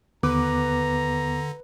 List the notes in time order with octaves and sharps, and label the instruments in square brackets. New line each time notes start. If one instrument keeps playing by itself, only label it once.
[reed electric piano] D#2 B3 D6 [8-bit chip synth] D3 [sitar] B4 [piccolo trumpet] A#5